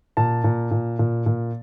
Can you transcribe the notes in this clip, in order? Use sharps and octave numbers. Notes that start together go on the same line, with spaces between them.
A#2 A5
A#2
A#2
A#2
A#2